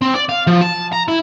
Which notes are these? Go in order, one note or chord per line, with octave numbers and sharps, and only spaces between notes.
C4
D5
F5
F3
A5
A#5
E4